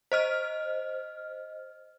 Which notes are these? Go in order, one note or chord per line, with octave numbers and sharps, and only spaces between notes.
C5 D#5 F6